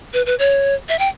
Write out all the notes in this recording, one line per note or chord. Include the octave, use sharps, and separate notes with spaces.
B4
B4
C#5
E5
G5